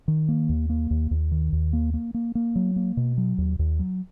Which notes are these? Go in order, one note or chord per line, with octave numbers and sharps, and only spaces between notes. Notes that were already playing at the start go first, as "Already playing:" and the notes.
D#3
A#3
D#2
A#3
D#2
D#2
D#3
D#2
A#3
A#3
A#3
A#3
F#3
A#3
B2
F#3
D#2
D#2
F#3